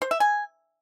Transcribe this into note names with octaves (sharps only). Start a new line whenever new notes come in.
C5
E5
G#5